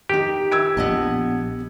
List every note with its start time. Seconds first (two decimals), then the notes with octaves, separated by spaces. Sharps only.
0.09 D#3 D#4 G4
0.51 E6 G#6 D7
0.77 A#1 B3 D#5 A5